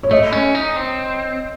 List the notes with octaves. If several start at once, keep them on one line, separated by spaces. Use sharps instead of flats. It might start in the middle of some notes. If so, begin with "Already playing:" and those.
C#5
A3 D#5
C#4
D#4
C4